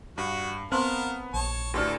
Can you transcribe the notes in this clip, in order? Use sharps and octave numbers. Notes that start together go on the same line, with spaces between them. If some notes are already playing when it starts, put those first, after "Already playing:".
G2 F#4 A5
B3 C4 A#4 C5 F5 A5 C6 C#6
A#1 C#5 A5
D2 A2 D4 F#4 G4 A4 B4